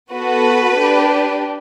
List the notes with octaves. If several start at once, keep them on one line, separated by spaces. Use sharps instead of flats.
B3 F#4 A4 B4
D4 G4